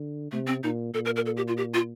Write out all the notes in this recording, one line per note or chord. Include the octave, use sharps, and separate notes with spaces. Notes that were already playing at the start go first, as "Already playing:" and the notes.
Already playing: D3
C3 A3
C4
A#2 D#4
A#2 A4
A#4
A#4
A4
G4
F4
G4
F4